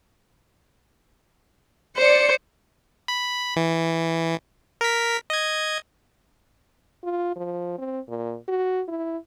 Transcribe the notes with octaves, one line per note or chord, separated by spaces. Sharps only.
C5 D5 C#7
B5
E3
A#4 B6
D#5 G#6
F4
F3
C4
A#2
F#4
E4